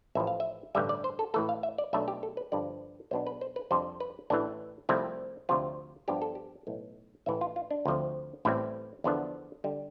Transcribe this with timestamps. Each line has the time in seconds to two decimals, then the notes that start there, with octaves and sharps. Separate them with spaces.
0.15 A1 A2 F3 E5
0.27 F5
0.40 E5
0.75 A1 G2 D3 G3 E5
0.89 D5
1.04 C5
1.19 A4
1.34 A2 E3 A3 A4
1.49 F5
1.63 E5
1.78 D5
1.93 B1 B2 A3 D4 E5
2.08 G4
2.23 A4
2.37 B4
2.52 G2 D3 F3 D5
3.11 B1 B2 B3 D4 C5
3.27 B4
3.41 C5
3.56 B4
3.71 F2 C3 G3 D4 C5
4.00 B4
4.30 A1 A2 E3 D4
4.89 C2 C3 F3 A3 C4 E4
5.49 D2 C3 F3 C4 F4
6.08 G2 F3 B3 D4 G4
6.22 A4
6.35 G4
6.67 B1 A2 E3
7.26 A1 A2 E3 E5
7.41 F4
7.56 F4
7.71 D4
7.86 D2 D3 F3 C4
8.45 A1 A2 G3 C4 E4
9.04 E2 D3 F3 B3 D4
9.64 D3 G3